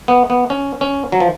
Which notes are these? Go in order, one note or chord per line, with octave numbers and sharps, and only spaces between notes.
B3
B3
C#4
C#4
F#3
F3